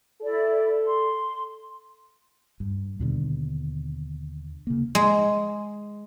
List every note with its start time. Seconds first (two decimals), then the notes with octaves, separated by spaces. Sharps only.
0.22 E4 A4 D5
0.85 C6
2.60 G2
2.99 D#2 B2 D3
4.67 C#3 A#3
4.95 G#3